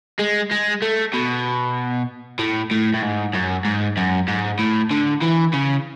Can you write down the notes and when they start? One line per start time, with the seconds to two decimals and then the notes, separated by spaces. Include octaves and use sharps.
0.19 G#3
0.51 G#3
0.82 A3
1.14 B2
2.39 A2
2.71 A2
2.93 A2
3.02 G#2
3.34 F#2
3.65 G#2
3.97 F#2
4.28 G#2
4.59 A2
4.91 D3
5.22 E3
5.54 C#3